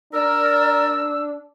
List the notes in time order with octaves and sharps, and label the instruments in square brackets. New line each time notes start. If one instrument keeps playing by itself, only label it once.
[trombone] D4 [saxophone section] A#4 [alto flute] D5 [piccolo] E6